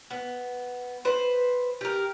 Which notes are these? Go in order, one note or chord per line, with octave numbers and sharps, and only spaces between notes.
B3
B4 C5
G4 A#4